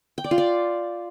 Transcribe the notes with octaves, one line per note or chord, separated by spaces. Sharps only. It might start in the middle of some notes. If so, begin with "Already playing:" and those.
G5
D5
F4
D5